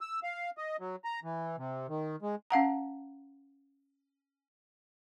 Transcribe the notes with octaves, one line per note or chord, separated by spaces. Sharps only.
E6
F5
D#5
F#3
A#5
E3
C3
D#3
G#3
C#4 F5 F#5 A#5